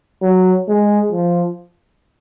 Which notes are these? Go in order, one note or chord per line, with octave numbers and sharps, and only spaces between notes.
F#3
G#3
F3